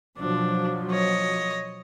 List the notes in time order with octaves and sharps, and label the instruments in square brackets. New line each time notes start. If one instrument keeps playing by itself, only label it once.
[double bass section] B2 F3 F#3 [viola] D4
[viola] C#5 D#5